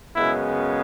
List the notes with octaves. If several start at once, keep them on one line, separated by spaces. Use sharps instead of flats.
F#2 C#3 G#3 B3 E4